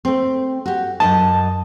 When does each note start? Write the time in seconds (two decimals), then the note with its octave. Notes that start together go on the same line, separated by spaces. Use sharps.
0.05 A3 C4
0.66 F#4 G4
1.00 F#2 C3 D#5 A5